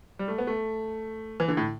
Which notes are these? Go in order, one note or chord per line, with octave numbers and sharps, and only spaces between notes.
G3
A3
B3
A3
E3
D3
A2